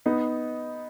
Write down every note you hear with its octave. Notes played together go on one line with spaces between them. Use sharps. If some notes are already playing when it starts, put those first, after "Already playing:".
B3 D#4